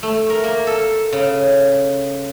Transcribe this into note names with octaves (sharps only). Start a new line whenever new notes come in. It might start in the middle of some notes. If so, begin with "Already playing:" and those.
A3
A#4
A#3
A4
C#3